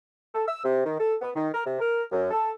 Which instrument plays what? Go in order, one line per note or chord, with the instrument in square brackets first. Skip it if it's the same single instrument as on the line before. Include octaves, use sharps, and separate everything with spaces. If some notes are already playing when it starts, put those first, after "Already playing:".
[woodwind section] A4
E6
C3
D#3
A4
B3
D#3
A#4
C3
A#4
F#2
A4